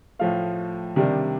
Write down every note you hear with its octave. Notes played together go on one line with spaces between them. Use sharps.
A2 F3 A3 F5
C3 D#3 G3 D4